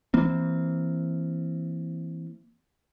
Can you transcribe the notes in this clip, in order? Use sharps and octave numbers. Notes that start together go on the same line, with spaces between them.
E3 A#3 C4